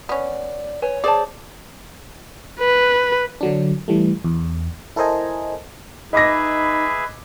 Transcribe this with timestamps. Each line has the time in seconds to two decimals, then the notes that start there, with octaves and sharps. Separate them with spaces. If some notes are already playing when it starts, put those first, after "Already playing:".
0.09 B3 C#4 D5
0.82 B4 C#5 G#5
1.04 G#4 C5 D5 A5
2.60 B4
3.41 D3 F#3 D4
3.88 E3 G3 A3
4.24 E2
4.96 E4 A4 A#4 C5 D#5 G#5
6.13 D#4 G#4 B4 D#5 E5 B5 D6 A#6